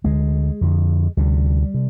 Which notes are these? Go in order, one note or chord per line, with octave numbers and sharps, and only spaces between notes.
D2 D3 G#3
F2 D3
D2 C3 G3
C3